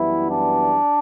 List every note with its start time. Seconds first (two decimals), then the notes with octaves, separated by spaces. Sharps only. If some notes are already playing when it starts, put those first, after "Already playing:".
Already playing: F#2 E3 G3 B3 E4
0.31 D4